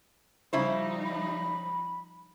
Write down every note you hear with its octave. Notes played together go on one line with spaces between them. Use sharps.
C#3 F3 G3 D#4 E4 C5
B5